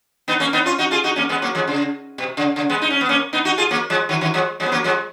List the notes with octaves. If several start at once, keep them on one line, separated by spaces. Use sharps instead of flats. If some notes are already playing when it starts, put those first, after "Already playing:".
B3 D#4
A#3 C#4
B3 D#4
C#4 F4
D#4 F#4
F4 G#4
D#4 F#4
A#3 C#4
G#3 B3
F#3 A#3
F3 G#3
C#3
B2
C#3
C#3
G#3 B3
D#4
C#4
B3
A#3 C#4
B3 D#4
D#4 F#4
F4 G#4
F#3 A#3
F3 G#3
D#3 F#3
D#3 F#3
F3 G#3
F3 G#3
B3
F#3 A#3
F3 G#3